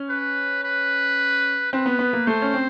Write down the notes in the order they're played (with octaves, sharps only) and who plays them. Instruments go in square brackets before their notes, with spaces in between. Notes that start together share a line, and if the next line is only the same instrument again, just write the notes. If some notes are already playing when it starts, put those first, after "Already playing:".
Already playing: [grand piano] C#4
[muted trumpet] B4
B4
[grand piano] C4 [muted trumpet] B4
[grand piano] B3
B3
A#3
[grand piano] A3 [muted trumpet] C5
[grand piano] C#4
C4